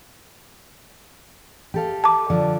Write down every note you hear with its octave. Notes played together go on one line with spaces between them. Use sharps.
G4 A4 F5
A5 D6
D3 F3